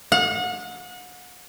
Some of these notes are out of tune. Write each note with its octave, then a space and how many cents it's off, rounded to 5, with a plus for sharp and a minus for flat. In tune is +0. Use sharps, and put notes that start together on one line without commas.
F#5 -35